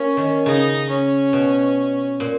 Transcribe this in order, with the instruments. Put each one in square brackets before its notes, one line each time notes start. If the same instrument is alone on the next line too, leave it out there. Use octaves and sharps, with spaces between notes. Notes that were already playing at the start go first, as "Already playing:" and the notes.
Already playing: [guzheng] A#3 [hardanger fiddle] C#4
[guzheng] D#3
[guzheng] C#3 [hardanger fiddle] D#4
[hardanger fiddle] C#4
[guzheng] B2
A#2